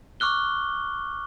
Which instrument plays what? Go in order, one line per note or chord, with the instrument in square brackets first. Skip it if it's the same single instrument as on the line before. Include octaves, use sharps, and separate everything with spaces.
[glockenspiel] C#6 D6 F6 F#6 G7